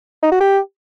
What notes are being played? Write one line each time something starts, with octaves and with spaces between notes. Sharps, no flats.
D#4
F#4
G4